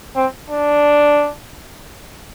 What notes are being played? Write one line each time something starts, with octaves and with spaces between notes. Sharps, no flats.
C4
D4